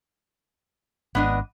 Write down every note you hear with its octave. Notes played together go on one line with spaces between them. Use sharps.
G#1 B3 D4 D#5